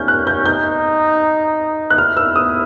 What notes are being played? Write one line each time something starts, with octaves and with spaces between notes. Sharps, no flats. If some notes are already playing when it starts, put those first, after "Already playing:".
Already playing: C#4 F6 G6
F#6
G6
D#4 G6
F#6
E4 F6
E6
D#6